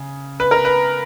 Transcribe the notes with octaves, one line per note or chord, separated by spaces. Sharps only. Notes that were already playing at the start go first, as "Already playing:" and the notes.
Already playing: C#3
B4
A#4
B4